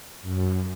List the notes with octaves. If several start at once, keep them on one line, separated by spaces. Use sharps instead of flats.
F#2